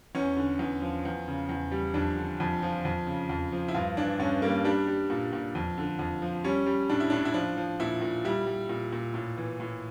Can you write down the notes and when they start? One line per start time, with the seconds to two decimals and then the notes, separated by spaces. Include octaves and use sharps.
0.15 E2 C#4
0.37 D3
0.59 E2
0.82 F3
1.05 E2
1.28 C#3
1.49 E2
1.71 G3
1.94 F2 D4
2.17 D3
2.40 F2
2.63 F3
2.85 F2
3.07 C#3
3.29 F2
3.52 F3
3.68 E4
3.74 G2 F4
3.97 E3 D4
4.19 G2 C#4
4.42 G3 A#3
4.64 G3 D4
4.87 G3
5.10 A#2
5.33 A#2
5.55 F2
5.78 D3
5.99 F2
6.22 F3
6.44 G3 C#4
6.66 G3
6.90 A2 D4
7.00 E4
7.10 A2 D4
7.25 E4
7.34 F3 D4
7.57 F3
7.80 A#2 E4
8.01 A#2
8.25 G3 E4
8.46 G3
8.69 A#2
8.92 A#2
9.14 A2
9.38 E3
9.60 A2